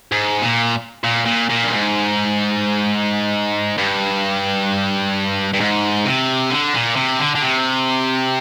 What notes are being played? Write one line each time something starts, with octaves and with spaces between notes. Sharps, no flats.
G#2
A#2
A#2
A#2
A#2
G2
G#2
G2
G2
G#2
C3
D3
A#2
C3
D3
D3
C3